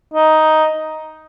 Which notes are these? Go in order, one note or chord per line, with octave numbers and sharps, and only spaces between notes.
D#4